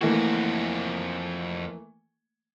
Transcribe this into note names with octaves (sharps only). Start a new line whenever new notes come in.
F2 E3 A3 A#3 F#4